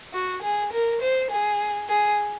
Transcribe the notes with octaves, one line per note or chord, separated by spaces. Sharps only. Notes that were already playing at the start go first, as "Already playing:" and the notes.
F#4
G#4
A#4
C5
G#4
G#4